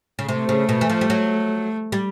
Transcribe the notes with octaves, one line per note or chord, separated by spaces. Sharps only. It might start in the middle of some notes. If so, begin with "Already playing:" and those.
C#3
C3 A3
C#3
B2
E3
F3
G3
F#3
G3